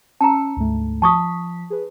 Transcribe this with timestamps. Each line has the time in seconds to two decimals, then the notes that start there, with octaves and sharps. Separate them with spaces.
0.21 C#4 A5 A#5 E6 C#7
0.57 D2 G#2 A3
1.02 F3 A5 C#6 D#6 B6
1.70 G#4 B4